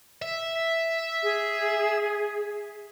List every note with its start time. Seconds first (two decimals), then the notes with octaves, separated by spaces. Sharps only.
0.22 E5
1.23 G#4